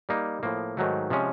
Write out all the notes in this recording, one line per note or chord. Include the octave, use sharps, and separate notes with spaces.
G3 A#3 D#4
A2 F3 A#3
G#2 D#3 F#3 A3
C3 F3 G#3 C#4